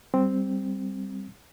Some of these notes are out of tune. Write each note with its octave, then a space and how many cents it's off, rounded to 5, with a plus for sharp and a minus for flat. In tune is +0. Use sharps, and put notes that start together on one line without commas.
G3 +0 C4 +0